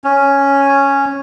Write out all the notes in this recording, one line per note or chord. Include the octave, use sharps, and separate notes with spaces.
C#4